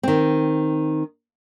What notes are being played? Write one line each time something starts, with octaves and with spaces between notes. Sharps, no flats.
D#3 C4